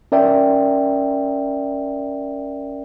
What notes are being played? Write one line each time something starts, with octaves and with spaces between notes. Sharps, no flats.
C#4 A#4 D5 E5 G5